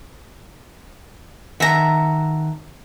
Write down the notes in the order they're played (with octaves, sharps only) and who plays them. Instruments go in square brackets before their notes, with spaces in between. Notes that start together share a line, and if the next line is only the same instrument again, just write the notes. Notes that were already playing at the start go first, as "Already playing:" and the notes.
[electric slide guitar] D#3 F#5 A5 [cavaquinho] E5 A#5